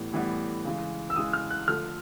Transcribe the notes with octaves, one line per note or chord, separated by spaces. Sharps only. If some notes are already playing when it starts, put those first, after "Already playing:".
Already playing: A2 E3 G3 B3
A2 E3 G3 B3
C#3 E3 G#3
E6
C#3 E3 G#3 D#6
F6
F#6
D3 F3 A3 F6